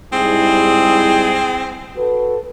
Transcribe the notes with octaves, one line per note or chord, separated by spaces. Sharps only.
G#2 G3 C4 E4 G#4
F#4 A4 B4